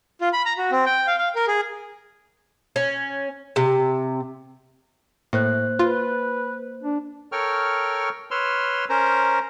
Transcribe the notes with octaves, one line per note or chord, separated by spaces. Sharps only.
F4
B5
A#5
F#4
C4
G5
F5
F5
A#4
G#4
C#4
C3
A2 A#3 C5 F#6
F4 B4
D4
A4 A#4 C#5 G5 C#6 F6
B4 C#5 C6 E6 F6
C#4 A#4 C5 A#5